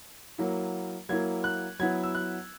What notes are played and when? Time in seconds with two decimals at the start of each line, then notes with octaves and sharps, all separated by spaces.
0.38 F#3 A#3 E4
1.09 F#3 A#3 E4 G#6
1.44 F#6
1.79 F#3 B3 E4 G#6
2.03 E6
2.15 F#6